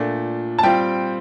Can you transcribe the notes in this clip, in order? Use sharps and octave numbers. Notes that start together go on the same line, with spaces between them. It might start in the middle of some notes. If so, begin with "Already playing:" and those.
Already playing: A#2 A3 D4
A5
G3 C4 F4 G5